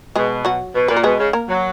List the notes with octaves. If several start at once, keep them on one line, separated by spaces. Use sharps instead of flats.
B2 G#3 G#4
F#3 F#4
B2
A#2 B4
A#4
B2 G#3 G#4
C#3
A#3 A#4
F#3